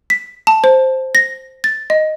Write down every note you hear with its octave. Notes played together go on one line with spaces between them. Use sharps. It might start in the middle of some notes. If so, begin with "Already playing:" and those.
B6
A5
C5
A#6
A6
D#5